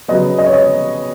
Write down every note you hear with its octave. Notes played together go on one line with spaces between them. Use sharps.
C#3 F#3 B3 D#5
D#5
C#5
D#5